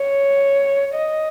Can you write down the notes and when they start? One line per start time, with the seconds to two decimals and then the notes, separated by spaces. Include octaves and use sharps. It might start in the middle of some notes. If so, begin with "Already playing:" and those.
Already playing: C#5
0.94 D#5